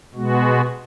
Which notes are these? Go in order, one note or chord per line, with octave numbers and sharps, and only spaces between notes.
B2 G#3 B3 F#4